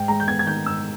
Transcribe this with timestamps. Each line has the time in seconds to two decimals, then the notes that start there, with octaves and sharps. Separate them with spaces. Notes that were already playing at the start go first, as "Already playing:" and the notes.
Already playing: G#2 G5
0.08 G#3 A#5
0.20 G6
0.28 B3 G#6
0.39 G#6
0.47 D#3 G6
0.66 G#2 E6